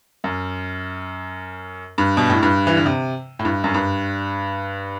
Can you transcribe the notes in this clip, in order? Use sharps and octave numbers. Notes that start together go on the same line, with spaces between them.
F#2
G2
B2
A2
G2
E3
D3
C3
A2
G2
F#2
G2